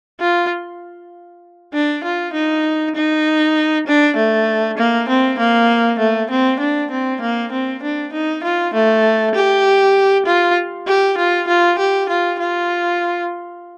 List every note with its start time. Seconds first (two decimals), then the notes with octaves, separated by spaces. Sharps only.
0.20 F4
1.73 D4
2.04 F4
2.33 D#4
2.95 D#4
3.87 D4
4.16 A3
4.78 A#3
5.09 C4
5.39 A#3
5.99 A3
6.30 C4
6.60 D4
6.91 C4
7.21 A#3
7.52 C4
7.82 D4
8.13 D#4
8.44 F4
8.74 A3
9.35 G4
10.26 F4
10.87 G4
11.17 F4
11.48 F4
11.79 G4
12.09 F4
12.39 F4